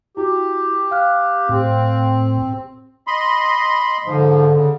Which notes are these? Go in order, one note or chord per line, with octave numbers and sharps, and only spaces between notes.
E4 F#4 G4
F5 F6 F#6
A2 C4
D#5 B5 C6
G#2 D3 F3
C#3